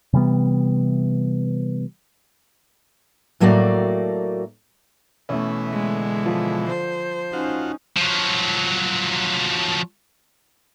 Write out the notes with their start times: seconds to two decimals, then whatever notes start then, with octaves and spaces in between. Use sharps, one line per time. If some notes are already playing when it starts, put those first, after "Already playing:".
0.13 C3 E3 G3 B3
3.40 A2 F#3 A3 A#3 F#4 D5
5.29 B2 E3 A3 C#4
5.72 D3 G#3
6.26 F3
6.69 C5
7.33 C#4 D#4 F4 F#4
7.97 F3 F#3